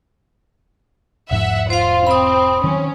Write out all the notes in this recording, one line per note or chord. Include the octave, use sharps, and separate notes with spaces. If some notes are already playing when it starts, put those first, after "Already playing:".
E1 G#2 F3 E5 F#5
F4 C5 F5
C4 B5 D#6
D#3 F#3 C4 C#4